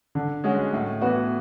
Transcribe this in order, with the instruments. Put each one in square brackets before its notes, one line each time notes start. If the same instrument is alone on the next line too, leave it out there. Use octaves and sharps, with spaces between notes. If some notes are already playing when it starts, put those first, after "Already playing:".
[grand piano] D3
G#3 C#4 F#4
A2
E3 B3 F#4